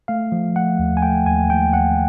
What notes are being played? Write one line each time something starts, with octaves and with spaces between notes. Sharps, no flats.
A3 F5
F3
A3 F#5
D#2
G#5
A3 G5
D#2 G#5
D#2 G5
D#2 F#5